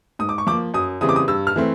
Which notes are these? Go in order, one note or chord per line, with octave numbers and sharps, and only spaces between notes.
G#2 D#6
D6
C#6
F3 A#3 D6
F#2 D#6
C#3 E3 G3 C4 D#6
D6
D#6
G2 E6
F6
E3 A3 C4